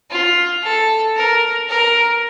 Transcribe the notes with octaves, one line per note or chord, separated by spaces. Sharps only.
F4
A4
A#4
A#4